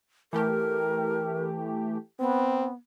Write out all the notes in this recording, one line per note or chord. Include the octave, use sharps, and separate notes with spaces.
E3 A3 G4 A#4
B3 C4